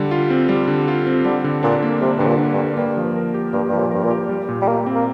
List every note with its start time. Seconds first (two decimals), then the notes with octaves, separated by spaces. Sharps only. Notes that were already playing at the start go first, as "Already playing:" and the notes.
Already playing: D3 G3
0.11 F4
0.30 C4
0.49 G3
0.68 D3
0.88 F4
1.07 C4
1.25 D3 G3
1.44 D3
1.63 A#2 D4
1.82 A#3
2.01 C3 G3
2.18 G2 D3
2.27 A#2
2.39 D4
2.52 G2
2.58 A#3
2.77 G2 A#3
2.97 F3
3.16 A#4
3.34 G4
3.53 G2 A#3
3.69 G2 F3
3.79 A#2
3.91 G2 A#4
4.04 A#2
4.10 G4
4.29 G3
4.49 A#2
4.62 G3
4.67 A#2 A#3
4.86 C4
4.96 A#3